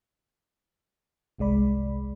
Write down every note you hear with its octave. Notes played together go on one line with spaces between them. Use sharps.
G1 C2 G#3 D5 B5